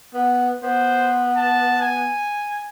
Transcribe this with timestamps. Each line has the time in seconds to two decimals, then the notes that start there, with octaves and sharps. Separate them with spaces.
0.14 B3
0.63 B3 C5
1.37 A5
1.81 G#5